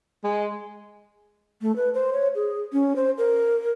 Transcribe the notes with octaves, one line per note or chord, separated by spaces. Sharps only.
G#3
A3
B4
C5
C#5
G#4
C#4
C5
A#4